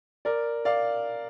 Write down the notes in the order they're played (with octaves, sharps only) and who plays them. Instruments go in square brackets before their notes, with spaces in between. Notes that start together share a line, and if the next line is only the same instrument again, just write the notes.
[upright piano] A#4 D5
D5 F5